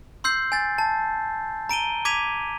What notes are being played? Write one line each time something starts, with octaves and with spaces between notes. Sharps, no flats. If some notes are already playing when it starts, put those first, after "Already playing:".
C6 E6 G6 C7
G#5 A6
A5
A#5 D7 D#7 G7
D6 G#6 B6 D#7 F7